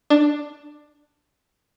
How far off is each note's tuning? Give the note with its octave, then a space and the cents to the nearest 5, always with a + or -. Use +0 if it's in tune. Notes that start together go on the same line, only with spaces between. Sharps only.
D4 +10